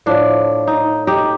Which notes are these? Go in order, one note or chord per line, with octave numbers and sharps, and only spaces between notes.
A2 F3 A3 D4
D#4
D#4 G4